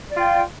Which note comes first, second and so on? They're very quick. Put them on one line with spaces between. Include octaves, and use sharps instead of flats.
D5 F4 G5